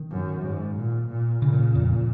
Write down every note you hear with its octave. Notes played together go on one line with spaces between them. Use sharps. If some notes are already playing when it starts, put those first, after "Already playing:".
Already playing: D#3
F#2
G#2
A#2
A#2
A#2 C#3
D#3
C#3
F2